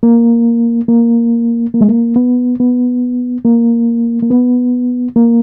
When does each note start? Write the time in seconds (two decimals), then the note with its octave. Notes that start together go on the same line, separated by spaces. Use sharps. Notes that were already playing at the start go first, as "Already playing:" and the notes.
0.03 A#3
0.88 A#3
1.74 A#3
1.81 G#3
1.88 A#3
2.16 B3
2.60 B3
3.45 A#3
4.22 A#3
4.30 B3
5.16 A#3